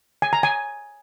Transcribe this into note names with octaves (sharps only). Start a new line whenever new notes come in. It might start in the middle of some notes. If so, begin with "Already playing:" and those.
G#5
A#5
G#5